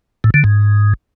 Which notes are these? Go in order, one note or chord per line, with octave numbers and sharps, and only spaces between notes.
A2
D3
G#2